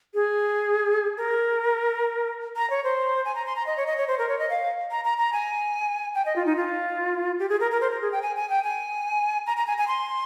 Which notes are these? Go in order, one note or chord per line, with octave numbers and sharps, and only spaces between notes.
G#4
A#4
A#5
C#5
C5
G#5
A#5
C6
A#5
D#5
C#5
D#5
C#5
C5
A#4
C#5
D#5
F5
A#5
A#5
A#5
G#5
G5
D#5
F4
D#4
F4
G4
G#4
A#4
A#4
C5
A#4
G#4
G5
G#5
G#5
G5
G#5
A#5
A#5
G#5
G#5
C6